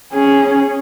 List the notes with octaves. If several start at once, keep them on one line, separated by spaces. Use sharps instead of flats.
C#4 G#4